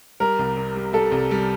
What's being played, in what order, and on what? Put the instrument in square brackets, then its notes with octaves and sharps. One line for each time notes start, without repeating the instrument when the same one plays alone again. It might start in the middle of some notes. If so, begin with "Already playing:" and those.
[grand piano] G3 [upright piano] A#4
[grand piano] C2
C3
G3
[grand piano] G3 [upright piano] A4
[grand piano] C2
G3